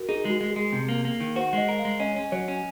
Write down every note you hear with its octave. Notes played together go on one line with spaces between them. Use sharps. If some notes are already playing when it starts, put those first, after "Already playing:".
Already playing: F#4 A#4
D#4 G#4
G#3 F#4
G#3
G#4
G#3
C3
A#3
A#3
D#3
F#4 C5
G#3 D#5
A#4
F5
G#3
C#4 D#5
C#4
F#3 C#5
C#4